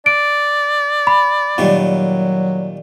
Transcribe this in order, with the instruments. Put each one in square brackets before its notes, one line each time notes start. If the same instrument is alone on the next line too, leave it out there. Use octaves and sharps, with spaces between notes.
[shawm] D5 [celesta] D7
[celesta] B5
[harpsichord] A#2 D#3 G3 [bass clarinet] F#3